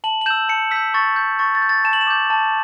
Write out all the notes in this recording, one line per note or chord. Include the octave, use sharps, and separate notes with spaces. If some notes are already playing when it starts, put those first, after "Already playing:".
A5 F#7
F#7
E6 G6 E7
A5 C#7
E6 G6 B6
C#6 A6
G6
C#6 A6
A6
G6
A6
A5 E7
F#7
E7
D6 G6
A5